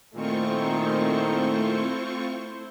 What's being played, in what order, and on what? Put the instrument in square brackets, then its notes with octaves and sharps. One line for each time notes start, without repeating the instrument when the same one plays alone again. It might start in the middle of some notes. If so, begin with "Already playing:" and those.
[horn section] A#2 D#3 [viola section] A3 E4 C5 [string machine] C4 F4 C#6